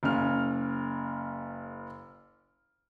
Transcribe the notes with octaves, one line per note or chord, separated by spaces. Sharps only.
F#1 C#3 F6